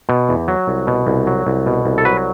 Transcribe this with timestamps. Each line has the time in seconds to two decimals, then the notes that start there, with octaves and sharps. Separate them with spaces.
0.09 B2
0.29 E2
0.48 F#3
0.68 C2
0.87 B2
1.07 C2
1.27 F#3
1.47 C2
1.66 B2
1.85 C2
1.98 A4
2.05 F#3 B4